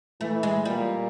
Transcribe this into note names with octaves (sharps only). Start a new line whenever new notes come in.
E3 A3
G#3
A#2 G3